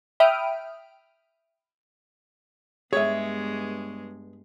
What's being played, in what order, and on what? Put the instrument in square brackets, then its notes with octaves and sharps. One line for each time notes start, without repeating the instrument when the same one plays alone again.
[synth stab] E5 G5 B5 D#6 F6 D7
[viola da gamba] G2 G#3 B3 [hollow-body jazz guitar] G#4 E5 [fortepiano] C#5